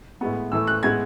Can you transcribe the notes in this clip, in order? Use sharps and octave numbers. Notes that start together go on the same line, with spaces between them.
A2 G#3 B3
A2 E3 A3 E6
F#6
A2 G#3 B3 G#6